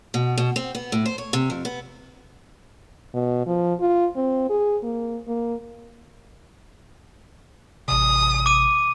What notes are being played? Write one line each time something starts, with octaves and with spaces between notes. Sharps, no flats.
B2
B2
C4
B3
A2
C5
C#5
C3
F2
B3
B2
F3
F4
C4
G#4
A#3
A#3
A1 C3 D#6
D6 D#7